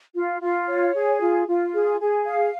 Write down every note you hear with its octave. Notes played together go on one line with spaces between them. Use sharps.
F4
F4
C#5
G#4
F4
F4
G#4
G#4
F5